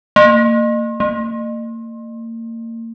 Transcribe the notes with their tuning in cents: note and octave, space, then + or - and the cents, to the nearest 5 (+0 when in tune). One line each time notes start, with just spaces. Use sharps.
A#3 -30
A#3 -35